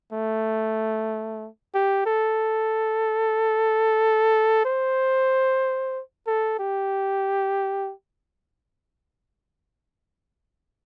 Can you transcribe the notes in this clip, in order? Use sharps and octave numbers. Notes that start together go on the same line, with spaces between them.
A3
G4
A4
C5
A4
G4